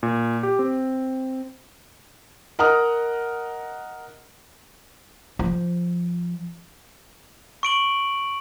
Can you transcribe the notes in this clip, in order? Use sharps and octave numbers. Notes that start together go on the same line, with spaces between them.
A#2
G4
C4
A#4 D#5 F#5 A#5 D#6 F6
F3
C#6 D7 F#7